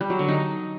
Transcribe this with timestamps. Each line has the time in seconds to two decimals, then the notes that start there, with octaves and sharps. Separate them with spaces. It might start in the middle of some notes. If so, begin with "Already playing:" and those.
0.01 G3
0.10 F#3
0.19 D3
0.28 D#4